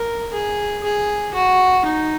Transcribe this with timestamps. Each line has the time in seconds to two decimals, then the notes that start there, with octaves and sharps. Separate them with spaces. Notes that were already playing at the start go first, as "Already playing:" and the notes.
Already playing: A#4
0.33 G#4
0.83 G#4
1.34 F#4
1.85 D#4